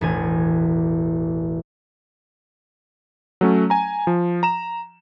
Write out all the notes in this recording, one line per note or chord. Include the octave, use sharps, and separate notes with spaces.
E1 A1 G#5
F#3 A3 C#4
G#5 A#5
F3
A#5 E7